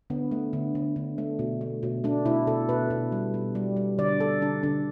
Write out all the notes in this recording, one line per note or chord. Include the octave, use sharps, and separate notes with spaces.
D3 B3
A3
D3
D3
D3
A3
B2
A3
B2
A3 D4
B2 E4
B2 A4
B2 B4
B2
G3
B2
G3
G3
D3 D5
D3 A4
D3 D4
D3 D4